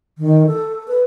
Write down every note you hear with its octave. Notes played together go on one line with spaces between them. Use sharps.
D#3
A4
B4